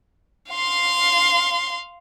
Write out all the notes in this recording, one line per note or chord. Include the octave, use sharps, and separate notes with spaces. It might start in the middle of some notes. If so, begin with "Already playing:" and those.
F5 C6